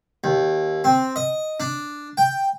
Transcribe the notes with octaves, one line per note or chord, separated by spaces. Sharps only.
D#2
C4
D#5
D4
G5